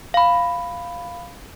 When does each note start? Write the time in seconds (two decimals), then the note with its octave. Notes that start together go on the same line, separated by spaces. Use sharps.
0.14 F5 B5